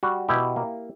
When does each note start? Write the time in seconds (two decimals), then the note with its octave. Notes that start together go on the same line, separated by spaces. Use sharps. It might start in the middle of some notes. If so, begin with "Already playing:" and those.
0.03 G3 F#4
0.29 B2 E4 G4
0.56 A#3